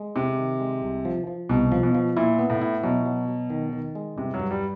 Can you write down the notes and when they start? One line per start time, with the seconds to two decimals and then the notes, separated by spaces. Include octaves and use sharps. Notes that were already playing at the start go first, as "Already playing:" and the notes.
Already playing: G#3
0.16 C3 C4
0.38 D#3
0.60 G#3
0.82 C2
1.05 F3
1.27 F3
1.49 C2 B2
1.72 F3
1.83 B2
1.95 F3
2.17 A#2 E4
2.39 B3
2.50 A2
2.62 E4
2.83 B2 F#3
3.05 F#3
3.28 F#3
3.50 D#3
3.73 D#3
3.95 G#3
4.18 G2 C3
4.34 F#3
4.40 G2
4.51 G3